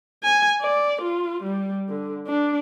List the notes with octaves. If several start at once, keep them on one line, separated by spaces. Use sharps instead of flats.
G#5
D5
F4
G3
D3
D4